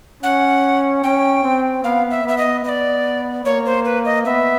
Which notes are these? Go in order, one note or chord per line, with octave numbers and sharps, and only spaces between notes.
C#4 F#5
C#4 G5
C4
B3 F5
E5
B3 E5
D#5
B3 D5 D#5
A#3 C#5
C5
B4
D#5
B3 E5